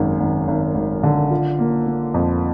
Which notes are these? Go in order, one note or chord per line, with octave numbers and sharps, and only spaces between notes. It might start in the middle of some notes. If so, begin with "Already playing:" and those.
Already playing: G#1 F#2
G#1
G#1
G#1
D3
F4
A#3
A#3
F2